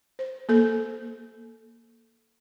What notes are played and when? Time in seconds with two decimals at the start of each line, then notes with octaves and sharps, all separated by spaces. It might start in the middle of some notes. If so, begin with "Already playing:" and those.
0.19 C5
0.49 A#3 A4